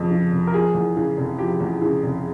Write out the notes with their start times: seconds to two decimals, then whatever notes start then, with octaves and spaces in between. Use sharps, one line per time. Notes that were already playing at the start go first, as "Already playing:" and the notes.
Already playing: F1 F2 C#3 F3
0.11 C#3
0.32 F1
0.47 A#4
0.53 F3 G#4
0.74 E2
0.96 C#3
1.17 F1
1.38 F3 G4
1.60 E2
1.82 C#3
2.03 F1